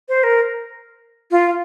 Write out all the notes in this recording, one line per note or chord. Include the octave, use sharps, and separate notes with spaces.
C5
A#4
F4